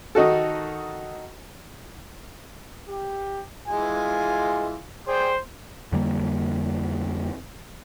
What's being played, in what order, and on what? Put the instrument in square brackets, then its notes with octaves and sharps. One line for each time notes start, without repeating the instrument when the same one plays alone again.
[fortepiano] D#3 D#4 F#4 A4
[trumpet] G4
[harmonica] E3 G#3 G#5 [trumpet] F4
[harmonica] G#4 D5 G5 [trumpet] C5
[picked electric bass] F2 D3 G3 A#3